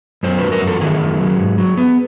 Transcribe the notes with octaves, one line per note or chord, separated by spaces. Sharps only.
F#2 C5
F#3 B4
A#4
F#2
A4
D#3 G#4
F#2
F#3
G#2
F#3
B3